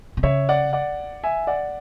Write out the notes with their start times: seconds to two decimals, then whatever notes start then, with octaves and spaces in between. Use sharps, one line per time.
0.17 B2
0.23 C#3 C#5 E5
0.49 D5 F#5
0.73 D5 F#5
1.23 E5 G#5
1.47 D5 F#5